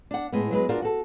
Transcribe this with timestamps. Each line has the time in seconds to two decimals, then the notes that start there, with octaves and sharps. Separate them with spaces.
0.11 D4 F#5
0.32 A2 G#3 B3
0.51 F#3 G#3 B4
0.69 D4 F4 F#4 G#4 A#4
0.82 F#4 A4